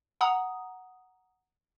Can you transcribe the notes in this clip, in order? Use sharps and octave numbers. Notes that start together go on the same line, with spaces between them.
F#5 A#5 D#6